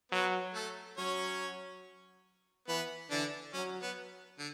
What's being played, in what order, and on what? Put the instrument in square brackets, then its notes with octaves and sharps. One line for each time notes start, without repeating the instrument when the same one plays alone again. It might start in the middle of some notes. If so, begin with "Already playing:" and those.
[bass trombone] F#3 [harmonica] B3 B4
[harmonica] A3 A4
[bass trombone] F#3 [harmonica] C#4 C#5
[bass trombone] E3 [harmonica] B3 B4
[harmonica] D3 D4 [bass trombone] E3
[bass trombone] F#3 [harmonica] C#4
[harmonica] B3
D3